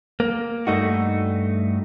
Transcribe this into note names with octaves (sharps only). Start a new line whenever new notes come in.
A#3
G2 A3 D#4 F#4